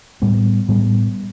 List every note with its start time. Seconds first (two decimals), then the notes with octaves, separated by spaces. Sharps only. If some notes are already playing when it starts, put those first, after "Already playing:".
0.22 A2 G3 B3
0.69 A2 G3 B3